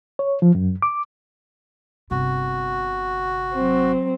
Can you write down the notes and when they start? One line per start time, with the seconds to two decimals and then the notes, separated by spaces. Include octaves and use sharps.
0.19 C#5
0.42 F3
0.55 F#2
0.82 D6
2.11 G1 C3 F#4
3.53 F#3 C4